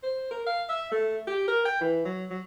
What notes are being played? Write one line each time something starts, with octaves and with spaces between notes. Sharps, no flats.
C5
A#4
F5
E5
A3
G4
A#4
G5
E3
F#3
F#3